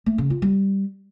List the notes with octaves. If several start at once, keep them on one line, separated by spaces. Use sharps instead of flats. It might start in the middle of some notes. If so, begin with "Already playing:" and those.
A3
C#3
F4
G3